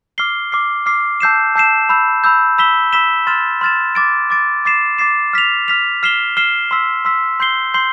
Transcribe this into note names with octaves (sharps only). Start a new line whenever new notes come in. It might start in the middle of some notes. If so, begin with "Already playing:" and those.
D6 F6 C7 G7
D6 F6 C7
D6 F6 C7
A5 E6 G6 C7 E7
A5 E6 G6 C7 E7
B5 E6 G6
B5 E6 G6
B5 E6 B6 E7 G7
B5 E6 B6 E7 G7
C6 F6 A6 E7
C6 F6 A6 E7
D6 A6 D7
D6 A6 D7
D6 A6 C7 E7
D6 A6 C7 E7
F6 B6 F7
F6 B6 F7
F6 C7 E7 G7
F6 C7 E7 G7
C6 E6 B6
C6 E6 B6
C6 G6 C7 G7
C6 G6 C7 G7